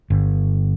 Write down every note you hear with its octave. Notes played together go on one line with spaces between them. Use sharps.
G1